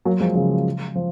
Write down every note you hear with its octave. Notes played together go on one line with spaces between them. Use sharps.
F#3 A#3
F3 G#3
C#3 F3
F3